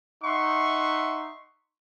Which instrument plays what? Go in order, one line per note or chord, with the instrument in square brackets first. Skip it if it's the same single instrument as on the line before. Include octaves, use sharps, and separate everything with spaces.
[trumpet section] D#4 E5 F#5 C6 C#6